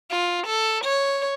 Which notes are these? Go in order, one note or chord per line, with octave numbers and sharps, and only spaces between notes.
F4
A4
C#5